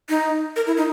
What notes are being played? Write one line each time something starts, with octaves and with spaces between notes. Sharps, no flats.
D#4
A#4
E4
D#4